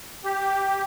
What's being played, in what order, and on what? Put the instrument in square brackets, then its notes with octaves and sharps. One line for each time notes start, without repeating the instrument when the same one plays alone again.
[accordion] G4